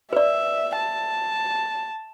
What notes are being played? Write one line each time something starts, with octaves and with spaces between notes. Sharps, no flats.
B4 D5 E5
A5